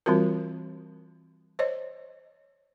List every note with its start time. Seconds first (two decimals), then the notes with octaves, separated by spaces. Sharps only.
0.06 E3 G3 C4 F4 F#4 A#4
1.59 C5 C#5 D#5